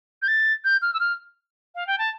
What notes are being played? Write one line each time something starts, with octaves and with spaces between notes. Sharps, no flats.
G6
A6
G6
F6
E6
F6
F5
G5
A5